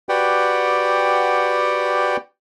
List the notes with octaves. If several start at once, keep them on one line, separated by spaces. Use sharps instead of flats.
F#4 G4 B4 D5 F#5 G5